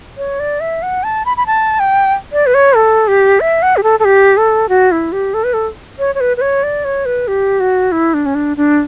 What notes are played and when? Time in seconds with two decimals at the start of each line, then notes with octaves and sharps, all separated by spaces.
0.17 C#5
0.40 D5
0.60 E5
0.83 F#5
1.04 A5
1.25 B5
1.37 B5
1.47 A5
1.79 G5
2.33 D5
2.46 B4
2.54 C#5
2.76 A4
3.08 G4
3.40 E5
3.62 F#5
3.77 G4
3.83 A4
4.00 A4
4.05 G4
4.37 A4
4.69 F#4
4.92 E4
5.12 G4
5.34 A4
5.44 B4
5.54 A4
5.99 C#5
6.15 C#5
6.20 B4
6.37 B4
6.41 C#5
6.63 D5
6.85 C#5
7.06 B4
7.28 G4
7.60 F#4
7.92 E4
8.14 D4
8.26 C#4
8.35 D4
8.57 D4